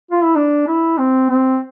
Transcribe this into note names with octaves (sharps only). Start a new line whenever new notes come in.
F4
E4
D4
E4
C4
C4